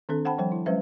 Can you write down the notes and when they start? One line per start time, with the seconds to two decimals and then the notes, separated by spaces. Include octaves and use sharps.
0.09 D#3 C4 D4 A4
0.25 C5 F#5 G5 A5 B5
0.38 F3 G3 C5 G5
0.52 E4
0.66 F#3 G#3 C#4 B4 C5 E5